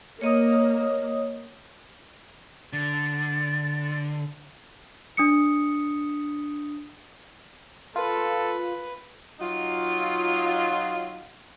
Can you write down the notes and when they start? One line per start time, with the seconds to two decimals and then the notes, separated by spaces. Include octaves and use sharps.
0.21 A#3 C#5 D#5 D#6
2.73 D3 A6
5.17 D4 D#6 C#7
7.96 F4 A4 B4
9.40 F#3 D#4 F4